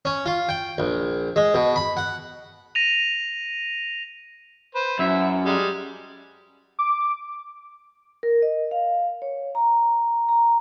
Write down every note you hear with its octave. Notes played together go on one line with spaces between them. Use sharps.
C#4
F4
G5
A#1
G#3
B2
B5
F#5
A#6 D#7 F7
B4 C5
F#2 E4
G3 G#3
D6
A#4
D#5
F5
C#5
A#5
A#5